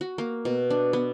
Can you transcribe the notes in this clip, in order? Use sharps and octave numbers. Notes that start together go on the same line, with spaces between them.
F#4
A#3
B2
D4
B3